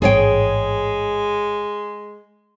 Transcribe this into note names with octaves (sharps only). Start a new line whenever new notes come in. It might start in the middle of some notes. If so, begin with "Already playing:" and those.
A1 G#2 G#3 G#4 C#5 G5